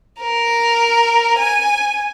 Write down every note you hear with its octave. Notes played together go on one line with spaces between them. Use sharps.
A#4
G#5